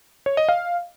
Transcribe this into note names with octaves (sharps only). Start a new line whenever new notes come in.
C#5
D#5
F5